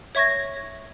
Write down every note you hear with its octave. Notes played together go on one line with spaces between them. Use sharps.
C#5 E5 C#6 G#6 A#6